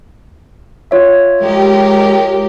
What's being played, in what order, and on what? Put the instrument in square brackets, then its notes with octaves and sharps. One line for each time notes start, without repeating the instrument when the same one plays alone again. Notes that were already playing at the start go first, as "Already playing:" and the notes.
[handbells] F4 C#5 E5
[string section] G#3 G4 A#4